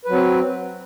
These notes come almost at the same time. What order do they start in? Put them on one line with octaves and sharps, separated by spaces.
B4 F#3 C4